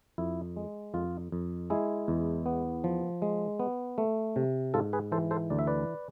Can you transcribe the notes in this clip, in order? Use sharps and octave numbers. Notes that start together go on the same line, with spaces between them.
F2 E4
G#3
F2 F4
F2
G#3 E4 G#4
E2
B3
F3
G#3
B3
A3
C3
G#2 F4 A4
G#4 B4
E3 A4 C5
A4 C5
D2 D5
E5
B4 D5